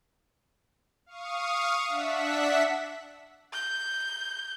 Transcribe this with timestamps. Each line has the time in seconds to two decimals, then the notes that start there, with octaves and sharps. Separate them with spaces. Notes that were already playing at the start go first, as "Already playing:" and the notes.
1.06 F5 C#6 D#6
1.87 D4 E5 F#5 B6
3.53 G6